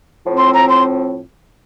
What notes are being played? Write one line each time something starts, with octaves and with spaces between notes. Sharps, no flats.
A2 F3 C4
C6
A#5
C6